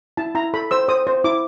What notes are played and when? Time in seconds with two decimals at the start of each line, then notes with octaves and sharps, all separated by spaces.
0.17 E4 A5
0.35 E4 A#5
0.54 A4 B5
0.71 C5 E6
0.88 C5 D#6
1.07 C5
1.24 E4 D6